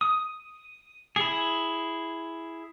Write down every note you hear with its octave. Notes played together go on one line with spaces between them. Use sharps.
D#6
E4 G#4